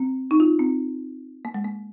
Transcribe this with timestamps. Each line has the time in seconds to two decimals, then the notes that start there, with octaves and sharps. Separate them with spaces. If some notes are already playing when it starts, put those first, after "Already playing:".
Already playing: C4
0.31 D#4
0.40 F4
0.59 C4
1.45 A#3
1.54 G#3
1.65 A#3